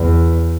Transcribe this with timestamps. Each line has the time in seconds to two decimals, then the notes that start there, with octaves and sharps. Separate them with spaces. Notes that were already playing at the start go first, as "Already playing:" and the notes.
Already playing: E2